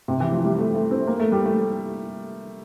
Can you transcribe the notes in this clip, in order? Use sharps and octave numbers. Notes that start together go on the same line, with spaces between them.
C3
E3
F3
G3
A3
A3
C4
A#3
A3
G3
A3